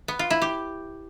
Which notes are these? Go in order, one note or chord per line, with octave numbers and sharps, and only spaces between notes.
B3
F4
E4
G4